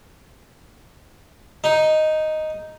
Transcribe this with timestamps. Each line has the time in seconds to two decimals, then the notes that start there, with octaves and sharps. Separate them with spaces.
1.64 D#4